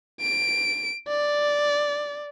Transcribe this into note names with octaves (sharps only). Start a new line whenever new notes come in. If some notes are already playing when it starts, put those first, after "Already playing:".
D7
D5